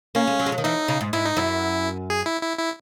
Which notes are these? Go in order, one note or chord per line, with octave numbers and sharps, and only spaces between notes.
A#3 C#4
G#3
F#3
G#3
F#3
D#3
E3 D#4
C#3
G#2
G#2 E4
D#4
F#2 E4
G#4
E4
E4
E4